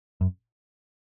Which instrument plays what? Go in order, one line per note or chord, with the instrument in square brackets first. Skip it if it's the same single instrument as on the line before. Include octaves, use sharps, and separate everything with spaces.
[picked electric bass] F#2